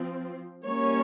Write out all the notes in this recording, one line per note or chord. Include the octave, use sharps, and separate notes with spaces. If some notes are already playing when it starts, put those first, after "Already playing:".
Already playing: F3 C4
G3 A#3 C#4 C#5